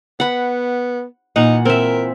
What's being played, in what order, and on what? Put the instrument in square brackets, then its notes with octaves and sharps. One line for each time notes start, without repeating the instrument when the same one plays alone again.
[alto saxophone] B3 [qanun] F#5 B5
[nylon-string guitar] A#2 E3 [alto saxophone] D#4 [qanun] F#5
[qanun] C4 E5 [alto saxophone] A#4